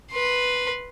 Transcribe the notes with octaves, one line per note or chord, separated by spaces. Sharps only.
B4 C6